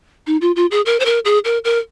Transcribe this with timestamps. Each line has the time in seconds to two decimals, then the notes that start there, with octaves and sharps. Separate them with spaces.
0.27 D#4
0.41 F4
0.56 F4
0.71 G#4
0.86 A#4
1.00 C5
1.05 A#4
1.25 G#4
1.45 A#4
1.64 A#4